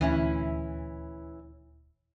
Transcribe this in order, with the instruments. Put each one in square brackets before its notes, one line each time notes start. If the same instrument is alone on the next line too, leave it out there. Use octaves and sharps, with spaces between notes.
[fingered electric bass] D#1 D2 [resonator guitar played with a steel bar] E3 C#4 E4